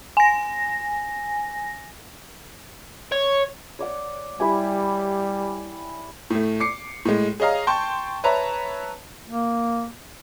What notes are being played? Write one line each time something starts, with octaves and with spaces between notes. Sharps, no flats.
G#5 A#6
C#5
C#5 D5 F#5
G3 E4 G4 G#5
A2 A3
D6 C7 C#7
A2 G#3
G#4 C#5 D#5 F5 A#5
G5 A5 C6 C#6 G6
B4 C#5 E5 A5 A#5
A#3